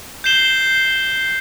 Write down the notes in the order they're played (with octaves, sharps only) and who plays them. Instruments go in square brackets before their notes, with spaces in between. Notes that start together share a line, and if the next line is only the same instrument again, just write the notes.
[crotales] G6 C7 E7 G7